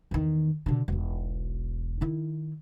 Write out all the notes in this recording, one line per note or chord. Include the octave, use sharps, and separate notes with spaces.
E2 D#3
B2 D3
E1 B1
D#3 E4